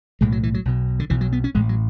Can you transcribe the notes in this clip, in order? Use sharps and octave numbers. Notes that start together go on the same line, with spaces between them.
B1 A2 G#3
F#3
E3
F#3
B1 B2
D3
B1 B2 E3
F#3
B3
C#4
A1 A2 G#3
F#3